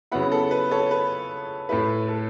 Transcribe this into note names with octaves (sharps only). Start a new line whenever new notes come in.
C#3 F#3 B3 E4 F#5 B5
A4
B4
A4 C#5
B4
A2 A3 E4 B4
A4